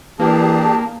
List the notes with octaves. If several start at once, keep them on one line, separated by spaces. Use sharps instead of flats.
E3 A#3 D4 G4 G#4 A5